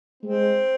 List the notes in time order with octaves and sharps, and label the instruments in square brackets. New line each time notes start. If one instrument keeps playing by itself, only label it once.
[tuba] G#3 [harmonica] C4